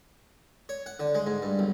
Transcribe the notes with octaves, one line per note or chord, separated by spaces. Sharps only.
C#5
F#5
D3
G#3
G#2
G2
B1